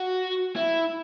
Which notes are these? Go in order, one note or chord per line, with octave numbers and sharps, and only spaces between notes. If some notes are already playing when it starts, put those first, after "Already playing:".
Already playing: F#4
E4